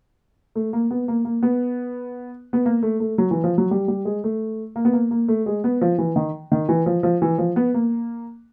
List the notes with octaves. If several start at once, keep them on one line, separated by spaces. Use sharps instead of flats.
A3
A#3
B3
A#3
A#3
B3
B3
A#3
A3
A3
F#3
E3
F3
F#3
G3
G3
G#3
A3
A#3
B3
A#3
A#3
A3
G#3
B3
F3
E3
D#3
D#3
E3
F3
F3
E3
F3
B3
A#3